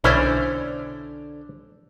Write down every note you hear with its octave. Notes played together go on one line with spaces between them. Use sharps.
B1 D3 C#4 E4 C5 D5